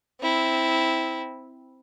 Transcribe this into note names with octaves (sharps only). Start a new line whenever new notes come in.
C4 E4